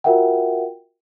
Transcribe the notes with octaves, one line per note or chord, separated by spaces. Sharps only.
F4 F#4 A#4 E5 F#5 G5